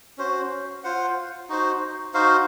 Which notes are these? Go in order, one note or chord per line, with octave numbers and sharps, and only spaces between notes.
C#4 F#4 C5
F4 C5 F#5
D#4 F#4 C5
D#4 F#4 C5 F5